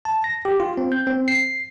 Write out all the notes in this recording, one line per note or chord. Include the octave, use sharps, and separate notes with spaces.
A5
A#6
G4
F4
C4
G6
C4
C7